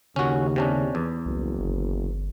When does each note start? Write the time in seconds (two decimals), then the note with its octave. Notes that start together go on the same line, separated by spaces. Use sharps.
0.16 D#2 C#3 C#4 F#4
0.56 C3 C#4 D4
0.95 E2
1.26 F#1 C2
1.60 G1